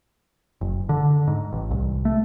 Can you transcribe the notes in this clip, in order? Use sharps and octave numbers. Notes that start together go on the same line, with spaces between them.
F#1
D3
G#2
A1
C2
A3